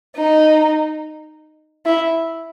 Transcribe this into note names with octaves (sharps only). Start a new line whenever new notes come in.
D#4
E4